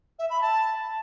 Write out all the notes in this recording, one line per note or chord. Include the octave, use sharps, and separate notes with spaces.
E5
B5
A5